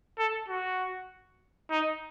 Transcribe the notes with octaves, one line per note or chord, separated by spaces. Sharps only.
A4
F#4
D#4